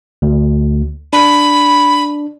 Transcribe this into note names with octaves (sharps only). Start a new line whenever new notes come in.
D2
D4 B5